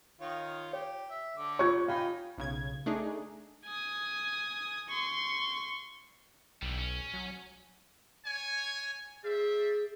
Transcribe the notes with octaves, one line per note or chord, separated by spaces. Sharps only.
D#3 F4 C#5
G4 C#5
E5
D3 D6
F4 C#5 C#6 G#6
D#4 F5 G5 G#5 B5
B1 C#3 G#6
A3 D4 D#4 G#4
G#5 D#6
C6 C#6
B1 E3 G3
C#4
F#3
C#5 G#5
G#4 C5 D5 E5